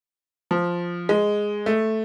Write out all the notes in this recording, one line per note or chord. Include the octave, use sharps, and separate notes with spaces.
F3
G#3
A3